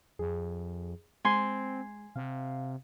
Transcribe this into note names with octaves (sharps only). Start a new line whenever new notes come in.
F2 G#4
G#3 C4 G#5 C6
C3 F5